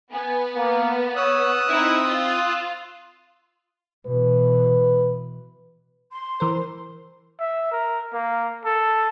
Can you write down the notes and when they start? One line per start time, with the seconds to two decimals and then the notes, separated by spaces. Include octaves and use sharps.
0.12 B3 G#5
0.55 A#3
1.16 C#5 D#6 E6 F#6
1.70 C4 D#4 E4
2.07 F4
4.06 B2 E3 B4
6.12 C6
6.40 E3 A#4 C5
7.40 E5
7.72 A#4
8.13 A#3
8.65 A4